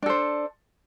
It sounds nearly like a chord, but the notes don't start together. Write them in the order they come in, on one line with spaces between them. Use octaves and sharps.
D4 A4 C5